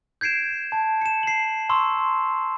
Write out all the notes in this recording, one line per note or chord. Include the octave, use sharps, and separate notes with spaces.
G6 G#6 C7 D7 E7
A5
C#7 E7
C7 F#7
A#5 C6 C#6 E6